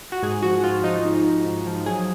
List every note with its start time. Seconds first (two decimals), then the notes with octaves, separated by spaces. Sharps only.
0.12 F#4
0.23 G#2 G#4
0.42 F3 F#4
0.64 G#2 F4
0.84 F3 D#4
1.05 G#2
1.26 F3
1.46 G#2
1.67 F3
1.86 F#3 G#4